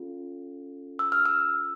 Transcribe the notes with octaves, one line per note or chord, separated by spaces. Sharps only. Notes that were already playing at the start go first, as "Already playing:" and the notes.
Already playing: C#4 F4 A4
E6
F6
E6